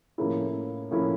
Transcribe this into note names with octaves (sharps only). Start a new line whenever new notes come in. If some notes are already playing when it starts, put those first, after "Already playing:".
A2 F3 A#3 C#4 E4
A2 F3 A#3 C#4 E4